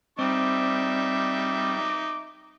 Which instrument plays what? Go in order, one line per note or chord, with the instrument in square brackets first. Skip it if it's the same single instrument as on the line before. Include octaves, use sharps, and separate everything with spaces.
[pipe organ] G3 [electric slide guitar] C4 [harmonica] D#4 E5 D6